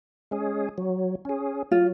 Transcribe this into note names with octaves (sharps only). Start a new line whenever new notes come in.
G#3 C#4 G#4
F#3
C#4 G#4
F#3 F4